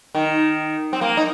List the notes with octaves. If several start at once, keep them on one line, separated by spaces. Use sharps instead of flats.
D#3
C4
A#3
D#4